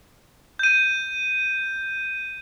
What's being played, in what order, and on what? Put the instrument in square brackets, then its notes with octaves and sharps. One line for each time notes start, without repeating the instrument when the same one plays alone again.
[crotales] G6 D#7